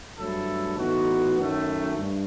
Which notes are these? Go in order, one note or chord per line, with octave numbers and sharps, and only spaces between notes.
G2 F#3 A3 E4 A4
A2 E3 B3 D#4 F#4
F#2 D#3 A3
G2